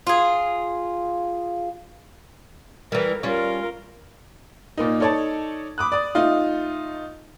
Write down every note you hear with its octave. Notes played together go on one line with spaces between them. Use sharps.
F4 G#4
E3 G3 A#4
G3 C#4 F4 A#4
A#2 A#3 D#4
D#4 A4 C#5 D5 A5
B5 D6 D#6 F#6
D5 D#6
A3 D#4 F4